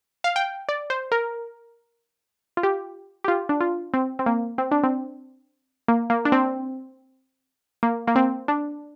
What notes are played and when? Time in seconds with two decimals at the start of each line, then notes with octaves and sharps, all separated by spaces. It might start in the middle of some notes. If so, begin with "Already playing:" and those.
0.24 F5
0.36 G5
0.69 D5
0.90 C5
1.12 A#4
2.57 F4
2.63 G4
3.24 G4
3.28 F4
3.49 D4
3.61 F4
3.94 C4
4.19 C4
4.26 A#3
4.58 C4
4.71 D4
4.83 C4
5.88 A#3
6.10 A#3
6.25 D4
6.32 C4
7.83 A#3
8.07 A#3
8.16 C4
8.48 D4